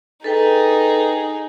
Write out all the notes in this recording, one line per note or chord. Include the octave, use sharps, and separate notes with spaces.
D#4 G#4 A4 B4 G5